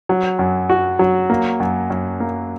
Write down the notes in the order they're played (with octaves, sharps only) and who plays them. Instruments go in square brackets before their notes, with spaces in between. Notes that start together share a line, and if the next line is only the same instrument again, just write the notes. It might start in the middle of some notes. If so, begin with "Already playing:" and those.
[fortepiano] F#3
F#2
F#4
F#3
A#3
F#2
F#2
A#3